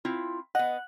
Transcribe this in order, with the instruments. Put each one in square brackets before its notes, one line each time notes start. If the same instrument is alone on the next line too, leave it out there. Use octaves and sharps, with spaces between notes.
[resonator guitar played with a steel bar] C4 E4 F4
[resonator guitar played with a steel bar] B3 D#5 [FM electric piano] F#5